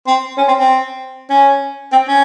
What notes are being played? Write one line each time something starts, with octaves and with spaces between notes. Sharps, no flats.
C4
C#4
C4
C4
C#4
C4
C#4